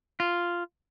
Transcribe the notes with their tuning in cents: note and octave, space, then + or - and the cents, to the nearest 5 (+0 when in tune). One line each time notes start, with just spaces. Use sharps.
F4 -5